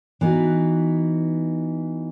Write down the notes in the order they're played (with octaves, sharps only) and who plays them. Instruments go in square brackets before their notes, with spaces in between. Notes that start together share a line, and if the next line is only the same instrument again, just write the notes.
[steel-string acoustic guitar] E3 B3 D#4 F#4